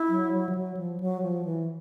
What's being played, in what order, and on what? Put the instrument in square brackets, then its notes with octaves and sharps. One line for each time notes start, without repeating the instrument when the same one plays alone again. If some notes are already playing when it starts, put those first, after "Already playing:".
Already playing: [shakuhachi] E4
[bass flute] F#3
F#3
F3
F#3
F3
F#3
F3
E3